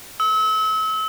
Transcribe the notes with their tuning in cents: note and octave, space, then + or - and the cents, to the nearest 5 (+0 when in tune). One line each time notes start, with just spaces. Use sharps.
E6 -35